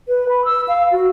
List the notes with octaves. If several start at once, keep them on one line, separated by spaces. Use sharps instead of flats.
B4
B5
E6
F5
F#4